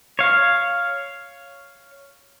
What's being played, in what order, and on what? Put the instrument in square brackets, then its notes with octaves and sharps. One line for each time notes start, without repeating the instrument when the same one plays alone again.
[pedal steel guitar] C#5 F5